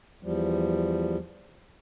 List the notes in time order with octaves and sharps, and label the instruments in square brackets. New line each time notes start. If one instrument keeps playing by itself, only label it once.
[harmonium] E2 F3 G3